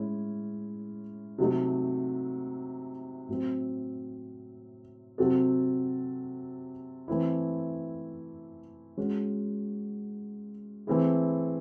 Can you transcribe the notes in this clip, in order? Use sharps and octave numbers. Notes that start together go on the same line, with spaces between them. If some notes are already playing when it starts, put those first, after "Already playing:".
Already playing: A2 G#3 C#4 E4
C3 F#3 A3 D#4
A2 F#3 C4
C3 F#3 C4 F#4 A4
E3 A3 C4 E4
G#3 C#4 F#4
E3 A3 C4 E4 G#4